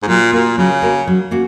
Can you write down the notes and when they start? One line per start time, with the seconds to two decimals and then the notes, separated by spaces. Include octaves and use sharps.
0.02 G#2
0.07 A#2 F#3
0.32 A#2 A#3 F#4 A#4
0.58 C#3 F#3
0.82 A#3 F#4 A#4
1.07 F#3
1.31 A#3 C#4 F#4